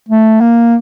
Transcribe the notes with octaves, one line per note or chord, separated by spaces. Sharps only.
A3
A#3